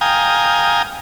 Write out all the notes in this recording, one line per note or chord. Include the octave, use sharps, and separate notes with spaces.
F5 G5 G#5 A#5 D#6